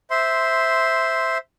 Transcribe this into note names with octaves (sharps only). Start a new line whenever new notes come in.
C5 E5 C6